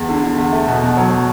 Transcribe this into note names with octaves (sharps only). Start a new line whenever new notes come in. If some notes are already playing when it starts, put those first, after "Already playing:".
Already playing: E2
D3
D3
E2
A3
B2
B2
F#3